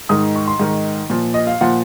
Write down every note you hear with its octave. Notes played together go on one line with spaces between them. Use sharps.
G#2 D#3 D#6
C#6
C6
G#2 D#3
A#2 F3
D#5
F5
A#2 F3 F#5